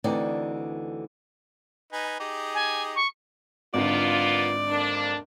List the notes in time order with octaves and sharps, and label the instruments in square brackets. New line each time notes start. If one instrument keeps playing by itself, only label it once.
[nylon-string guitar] D2 D3 E3 C4 D#4 D5
[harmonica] D#4 B4 G#5
D#4 G4 G#4
[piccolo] G#5
C#6
[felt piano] G#1 D3 [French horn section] A#3 B3 F4 [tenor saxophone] D5
[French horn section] F2 A#3 D4